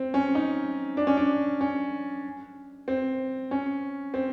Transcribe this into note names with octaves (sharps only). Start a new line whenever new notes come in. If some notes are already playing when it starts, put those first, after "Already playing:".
Already playing: C4
C#4
D#4
D4
C#4
D4
C#4
C4
C#4
C4